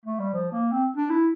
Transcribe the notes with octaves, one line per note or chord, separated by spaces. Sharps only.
A3
G3
F3
A#3
C4
D4
E4